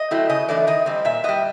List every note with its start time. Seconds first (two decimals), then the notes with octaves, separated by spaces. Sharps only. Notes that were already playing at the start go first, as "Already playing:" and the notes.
Already playing: D#5
0.11 F#3 A3 C4 E4
0.30 C#3 D#5
0.48 E3 A3 D4 D5
0.67 D#3 D#5
0.86 G3 C4
1.05 A#2 E5
1.24 G3 B3 D#5